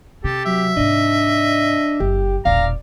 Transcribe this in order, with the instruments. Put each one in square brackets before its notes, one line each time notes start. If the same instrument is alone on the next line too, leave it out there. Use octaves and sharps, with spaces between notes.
[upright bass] C3 [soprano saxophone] G4 [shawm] A4
[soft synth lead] F#3 [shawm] E5
[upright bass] G#2 C3 [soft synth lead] D4 [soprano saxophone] D#5
[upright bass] F#1 [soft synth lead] G4
[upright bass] E1 A#1 [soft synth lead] D5 [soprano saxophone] F5 [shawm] A#5